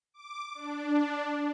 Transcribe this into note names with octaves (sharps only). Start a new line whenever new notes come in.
D6
D4